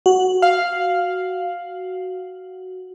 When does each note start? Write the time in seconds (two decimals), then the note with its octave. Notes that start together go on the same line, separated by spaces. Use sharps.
0.06 F#4
0.42 F5